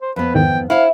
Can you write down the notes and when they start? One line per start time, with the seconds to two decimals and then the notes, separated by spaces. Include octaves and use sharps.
0.01 C5
0.16 F2 B3 B4
0.35 E2 G#2 D#3 G5
0.70 E4 C5 C#5 F5 F#5